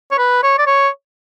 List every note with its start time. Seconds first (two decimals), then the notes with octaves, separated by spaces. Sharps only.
0.12 C#5
0.18 B4
0.43 C#5
0.58 D5
0.67 C#5